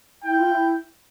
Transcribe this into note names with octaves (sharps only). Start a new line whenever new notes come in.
E4 G5
F4
E4